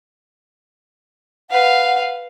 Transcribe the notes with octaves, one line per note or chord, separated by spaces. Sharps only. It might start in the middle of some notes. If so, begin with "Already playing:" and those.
B4 F5 F#5